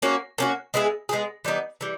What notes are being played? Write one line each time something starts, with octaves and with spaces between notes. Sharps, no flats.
A#3 C#4 F#4
A#3 C#4 F#4
G#3 B3 E4 G#4
G#3 B3 E4 G#4
E3 G3 B3 D#4
E3 G3